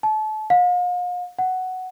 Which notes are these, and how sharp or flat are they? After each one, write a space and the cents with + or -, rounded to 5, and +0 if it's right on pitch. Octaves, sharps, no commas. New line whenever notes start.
A5 -30
F5 +40
F#5 +5